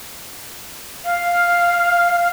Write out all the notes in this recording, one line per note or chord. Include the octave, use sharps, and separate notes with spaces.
F5